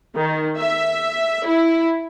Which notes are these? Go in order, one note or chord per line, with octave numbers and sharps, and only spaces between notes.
D#3
E5
E4